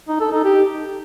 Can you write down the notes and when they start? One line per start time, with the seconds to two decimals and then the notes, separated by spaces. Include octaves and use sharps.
0.08 D#4
0.20 A4
0.32 D#4
0.44 G4